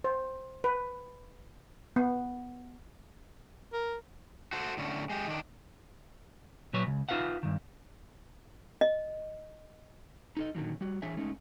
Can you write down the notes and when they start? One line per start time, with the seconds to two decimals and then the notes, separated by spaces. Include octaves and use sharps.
0.04 C5
0.64 B4
1.96 B3
3.73 A#4
4.53 F#4 A4 C5
4.77 A2 D3 C#4
5.10 G#3 G4
5.27 D#3 D4
6.73 A#2 F#3 B4 C#5
6.87 C#2
7.09 D#4 F4 B4 F5 F#5
7.43 G2 D#3
8.81 D#5
10.37 D#4 A4 D#5
10.55 A#2 D3 D#3 F#3 G3
10.81 G3 F#4
11.02 E3 D4 G#4 C#5 E5 G#5
11.17 G#3 A3 C#4 D#4